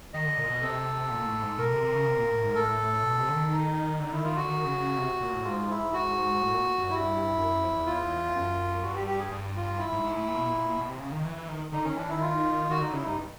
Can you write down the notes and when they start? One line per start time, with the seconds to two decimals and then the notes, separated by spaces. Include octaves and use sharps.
0.14 D#3 D#5
0.26 D3
0.38 A#2
0.50 B2
0.61 C3 A4
1.11 A#2
1.26 A2
1.42 G#2
1.58 B2 A#4
1.71 C3
1.83 C3
1.95 C#3
2.07 C3
2.18 A#2
2.30 A2
2.44 G#2
2.55 A2 A4
3.03 B2
3.19 C3
3.29 D3
3.35 D#3
3.52 D#4
3.99 D3 D#4
4.11 D#3 E4
4.24 D#3 F4
4.36 D3 F#4
4.48 D#3
4.65 C#3
4.80 C#3
4.97 C3
5.21 A#2
5.33 A2
5.44 G#2 F4
5.70 E4
5.93 F#4
6.42 A2
6.54 A#2
6.78 G2
6.84 F#2
6.90 G2 E4
7.37 F#2
7.50 F#2
7.63 F2
7.75 E2
7.87 E2 F4
8.35 F#2
8.83 G2 F#4
8.96 G4
9.07 G4
9.19 G#4
9.31 G2
9.56 F4
9.79 E4
9.92 G#2
10.04 G#2
10.16 A2
10.28 A#2
10.37 B2
10.47 A#2
10.77 B2
10.89 C3
11.00 C#3
11.12 D#3
11.25 E3
11.36 E3
11.48 D#3
11.72 D3 D#4
11.84 D#3 C#4
11.96 E3 D4
12.09 D#3 E4
12.21 F4
12.69 D#3 F#4
12.81 D3 D#4
12.93 C#3 E4
13.05 G2 D#4